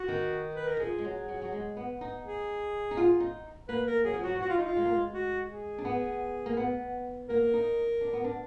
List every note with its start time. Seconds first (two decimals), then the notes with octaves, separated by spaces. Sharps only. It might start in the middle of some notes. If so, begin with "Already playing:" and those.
Already playing: F#4
0.08 D#3
0.55 B4
0.68 A#4
0.80 F3 G#4
0.98 G#3
1.05 F#3
1.28 F#3
1.42 F#3
1.53 G#3
1.77 B3
2.01 D#4
2.25 G#4
2.91 D#4
2.97 F4
3.20 D#4
3.68 A#3 B4
3.87 A#4
4.05 F#3 G#4
4.14 F3
4.23 F#3 F#4
4.36 F#3
4.41 F3 F#4
4.49 F4
4.58 D#4
4.66 F4
4.77 G#3
4.85 A#3
4.93 G#3
5.14 F#4
5.49 G#4
5.78 D4
5.85 B3
6.46 A#3
6.57 B3
7.29 A#3 A#4
7.54 D#4
8.01 D4
8.13 B3
8.24 D4